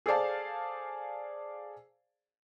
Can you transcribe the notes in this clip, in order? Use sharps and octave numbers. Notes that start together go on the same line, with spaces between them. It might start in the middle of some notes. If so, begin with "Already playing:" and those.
G#4 A4 C5 D5 F5 A5